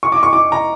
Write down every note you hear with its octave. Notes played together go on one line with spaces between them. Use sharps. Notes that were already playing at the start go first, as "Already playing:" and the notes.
C#6
D6
C#6
D6
A#5